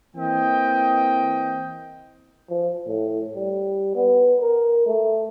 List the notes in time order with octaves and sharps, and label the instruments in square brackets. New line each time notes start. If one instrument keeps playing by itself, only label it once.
[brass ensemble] E3 A#3 C4 D#5 G5
[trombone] F3
A2
G3
B3
A#4
A3